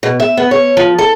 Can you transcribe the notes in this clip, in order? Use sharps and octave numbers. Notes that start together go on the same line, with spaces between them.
B2
E5
B3
C#5
F3
A4